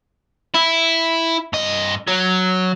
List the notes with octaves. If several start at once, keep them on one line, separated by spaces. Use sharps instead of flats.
E4
G2 D#5
F#3